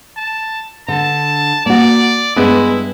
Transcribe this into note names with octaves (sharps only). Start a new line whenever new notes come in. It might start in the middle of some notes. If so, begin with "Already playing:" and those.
A5
D3 A5
A#3 F#4 D5
G2 G#3 B3 E4